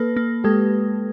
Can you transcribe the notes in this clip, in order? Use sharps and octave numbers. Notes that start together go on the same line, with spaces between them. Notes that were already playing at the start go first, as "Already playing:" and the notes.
Already playing: A#3 A4 B4
A#3
G#3 G4 A4